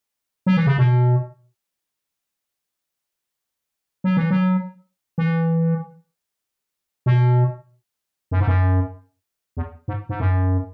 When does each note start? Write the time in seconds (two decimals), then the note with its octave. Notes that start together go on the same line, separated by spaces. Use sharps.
0.46 F#3
0.57 E3
0.67 C#3
0.78 B2
4.04 F#3
4.17 E3
4.31 F#3
5.18 E3
7.06 B2
8.31 F#2
8.40 G#2
8.47 F#2
9.57 E2
9.88 G#2
10.09 G#2
10.20 F#2